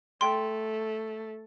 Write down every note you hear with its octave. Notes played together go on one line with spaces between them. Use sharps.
A3 G5 C6